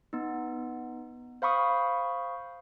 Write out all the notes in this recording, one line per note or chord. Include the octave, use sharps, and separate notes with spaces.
B3 D#4
C5 F5 B5 C#6 D#6